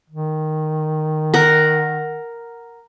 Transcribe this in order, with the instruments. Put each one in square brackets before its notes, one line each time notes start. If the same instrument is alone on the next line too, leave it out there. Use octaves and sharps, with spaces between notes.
[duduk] D#3
[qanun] A#4 F#5